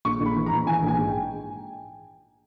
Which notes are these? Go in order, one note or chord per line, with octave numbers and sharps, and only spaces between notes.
A#1 C#6
A#1
B5
E3
A#5
A#1
E3 G#5
A#1
G#5
G#2
G5